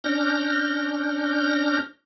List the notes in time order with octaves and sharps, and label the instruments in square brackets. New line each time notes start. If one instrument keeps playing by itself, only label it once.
[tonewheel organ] C#4 D4 F6 G6 A#6